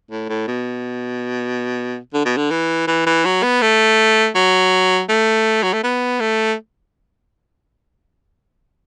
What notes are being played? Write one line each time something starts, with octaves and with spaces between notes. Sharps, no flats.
A2
A2
B2
D3
B2
D3
E3
E3
E3
F#3
B3
A3
F#3
A3
F#3
A3
B3
A3